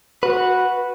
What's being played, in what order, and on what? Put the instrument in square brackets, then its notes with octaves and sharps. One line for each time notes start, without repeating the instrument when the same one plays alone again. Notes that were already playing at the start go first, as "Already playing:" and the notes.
[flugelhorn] F#4 [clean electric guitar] B4